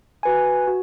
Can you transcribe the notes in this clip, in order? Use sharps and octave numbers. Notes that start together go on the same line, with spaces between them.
F#4 B4 G#5
F#4